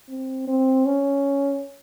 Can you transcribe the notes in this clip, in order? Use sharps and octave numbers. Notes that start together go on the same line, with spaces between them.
C4
C4
C#4